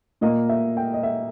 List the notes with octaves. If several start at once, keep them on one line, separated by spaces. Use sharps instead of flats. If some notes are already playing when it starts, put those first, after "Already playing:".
A#2 A#3 D#5
E5
G5
D#5
E5